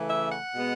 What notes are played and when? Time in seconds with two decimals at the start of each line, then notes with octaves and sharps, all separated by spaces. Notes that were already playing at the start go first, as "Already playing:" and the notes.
Already playing: C#3 E3 A3
0.10 E5
0.32 F#5
0.53 B2 G#3 B3